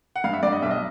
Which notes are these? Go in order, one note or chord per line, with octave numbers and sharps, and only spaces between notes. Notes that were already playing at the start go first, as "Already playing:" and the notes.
F#5
G2 F5
E5
G2 D5
D#5
B1 E5
D#5